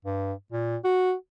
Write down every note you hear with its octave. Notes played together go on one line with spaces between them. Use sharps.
G2
A#2
F#4